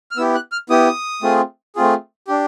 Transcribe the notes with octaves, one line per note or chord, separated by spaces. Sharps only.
F6
B3 E4 G4 E6
F#6
F6
B3 E4 G4 D#6
A3 C4 F4 G#4
A3 C4 F4 G#4
D4 G4